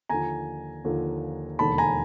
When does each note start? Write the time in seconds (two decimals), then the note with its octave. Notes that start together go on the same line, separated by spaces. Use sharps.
0.09 D#2 D3 F3 G#5 A#5
0.84 D#2 D3 F3
1.59 E1 D#2 D3 A5 B5
1.78 G#5 A#5